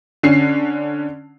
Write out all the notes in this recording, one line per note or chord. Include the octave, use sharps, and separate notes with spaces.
D3 C#4 C7